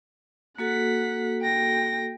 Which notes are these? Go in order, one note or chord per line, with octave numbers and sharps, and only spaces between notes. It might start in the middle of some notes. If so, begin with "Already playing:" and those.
A#3 F#4 A4 F#5 B6
G5 A#6